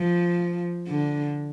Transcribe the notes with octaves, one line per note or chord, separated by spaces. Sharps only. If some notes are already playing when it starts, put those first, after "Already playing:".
Already playing: F3
D3